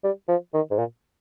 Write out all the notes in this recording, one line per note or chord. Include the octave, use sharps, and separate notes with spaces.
G3
F3
D#3
G#2
A#2